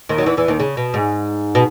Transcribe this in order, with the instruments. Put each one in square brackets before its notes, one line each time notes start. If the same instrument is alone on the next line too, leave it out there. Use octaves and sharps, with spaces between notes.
[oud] D#2 D#3
F#3
E2 E3
E2 E3
D#2 D#3
C#3
B2
G#2
B2